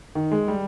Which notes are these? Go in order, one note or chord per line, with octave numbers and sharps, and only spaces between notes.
D#3
G#3
G3